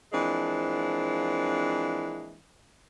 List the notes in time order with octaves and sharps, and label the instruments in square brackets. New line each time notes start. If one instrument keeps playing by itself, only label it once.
[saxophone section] E3 F3 G#3 A#3 C4 D4